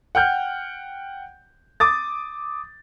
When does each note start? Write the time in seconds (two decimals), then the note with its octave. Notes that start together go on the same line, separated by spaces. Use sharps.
0.15 F#5 G5 F6 G6
1.80 D6 D#6 A6